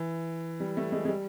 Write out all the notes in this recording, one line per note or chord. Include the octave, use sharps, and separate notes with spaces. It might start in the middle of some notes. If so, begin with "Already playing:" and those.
Already playing: E3
G3
A3
G#3
G#3
G3